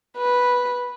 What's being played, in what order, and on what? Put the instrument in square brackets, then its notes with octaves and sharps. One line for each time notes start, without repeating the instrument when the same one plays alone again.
[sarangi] B4